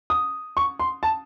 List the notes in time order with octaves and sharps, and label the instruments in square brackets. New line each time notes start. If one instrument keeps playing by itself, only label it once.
[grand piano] D#6
C#6
C6
A5